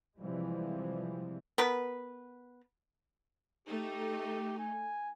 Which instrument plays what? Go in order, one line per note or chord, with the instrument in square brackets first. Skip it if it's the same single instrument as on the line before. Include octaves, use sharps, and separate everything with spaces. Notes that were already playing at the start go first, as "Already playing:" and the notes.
[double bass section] C3 E3 F3 G3 G#3
[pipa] B3 A#4 B4
[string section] A3 D#4 [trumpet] G4
[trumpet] G#5